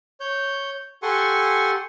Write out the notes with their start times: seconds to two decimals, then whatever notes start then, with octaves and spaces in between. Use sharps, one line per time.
0.20 C#5 G6
1.03 G4 A4 F#5 G#5 C6 C#6